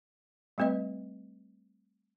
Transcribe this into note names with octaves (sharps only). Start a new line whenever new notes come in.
G3 A3 C4 B4 D#5